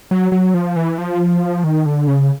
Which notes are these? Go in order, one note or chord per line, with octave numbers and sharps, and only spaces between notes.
F#3
F#3
F3
E3
F3
D#3
D3
C#3